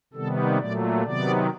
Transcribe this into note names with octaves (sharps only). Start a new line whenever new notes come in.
C3 D#3 G3 B3 A4
A#2 F#3 A3 D5
C3 D#3 F#3 B3 D5